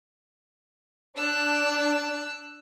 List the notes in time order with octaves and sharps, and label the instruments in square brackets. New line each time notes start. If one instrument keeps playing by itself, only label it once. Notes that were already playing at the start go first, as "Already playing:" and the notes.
[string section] D4 [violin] E6 F#6